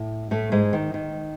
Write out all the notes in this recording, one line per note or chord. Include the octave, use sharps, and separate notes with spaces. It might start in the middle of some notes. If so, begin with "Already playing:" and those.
Already playing: A2
A2 A3
G#2 G#3
D#3
D#3